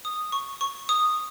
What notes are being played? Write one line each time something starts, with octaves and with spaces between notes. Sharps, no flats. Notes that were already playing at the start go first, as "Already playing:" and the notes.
D#6
C#6
C#6
D#6